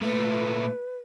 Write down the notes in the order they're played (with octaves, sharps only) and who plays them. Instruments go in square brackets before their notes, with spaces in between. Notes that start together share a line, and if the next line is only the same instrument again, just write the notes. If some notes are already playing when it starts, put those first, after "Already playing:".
[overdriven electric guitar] A#2 A3 [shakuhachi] B4